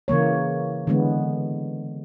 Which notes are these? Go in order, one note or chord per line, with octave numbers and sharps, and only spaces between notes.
C#3 E3 A#3 C#5
D3 E3 G#3 B3